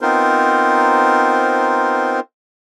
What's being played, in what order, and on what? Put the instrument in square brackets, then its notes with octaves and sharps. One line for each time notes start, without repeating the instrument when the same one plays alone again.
[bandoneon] B3 C4 D#4 F4 A#4 C5